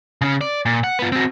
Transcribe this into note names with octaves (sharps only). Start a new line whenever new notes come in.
C#3 C#4
D5
A#2
F#5
B3 F4
C4 F#4